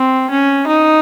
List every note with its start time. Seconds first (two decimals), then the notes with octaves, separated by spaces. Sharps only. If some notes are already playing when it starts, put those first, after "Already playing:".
Already playing: C4
0.30 C#4
0.67 D#4